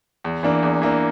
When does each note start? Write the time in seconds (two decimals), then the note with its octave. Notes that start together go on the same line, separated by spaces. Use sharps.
0.24 E2
0.43 E3 A#3 D4
0.63 E2
0.82 E3 A#3 D4